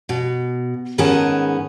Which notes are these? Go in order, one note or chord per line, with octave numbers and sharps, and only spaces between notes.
B2
G#2 D#3 B3 C#4 G#4 A5